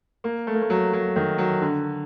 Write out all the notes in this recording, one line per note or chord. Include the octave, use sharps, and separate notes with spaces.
A#3
A3
A#3
A3
F#3
F#3
D#3
F#3
D3